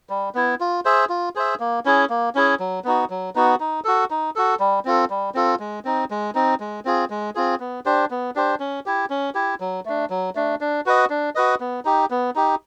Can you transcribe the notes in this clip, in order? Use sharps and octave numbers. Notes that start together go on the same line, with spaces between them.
G3
B3 E4
F4
G#4 C5 E5
F4
G#4 C5 E5
A#3
C#4 E4 G#4
A#3
C#4 E4 G#4
F#3
B3 D#4 F#4
F#3
B3 D#4 F#4
D#4
F#4 A4
D#4
F#4 A4
G3
C4 F4 A4
G3
C4 F4 A4
G#3
C4 D#4
G#3
C4 D#4
G#3
C4 F4 G#4
G#3
C4 F4 G#4
B3
D4 G4 C5
B3
D4 G4 C5
C#4
E4 G4
C#4
E4 G4
F#3
A3 D4
F#3
A3 D4
D4
F#4 B4 D#5
D4
F#4 B4 D#5
B3
D#4 G4
B3
D#4 G4